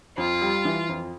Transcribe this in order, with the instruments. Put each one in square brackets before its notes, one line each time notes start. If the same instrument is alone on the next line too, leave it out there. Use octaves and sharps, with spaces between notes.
[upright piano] F2 [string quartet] F4
[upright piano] G3
E3
F2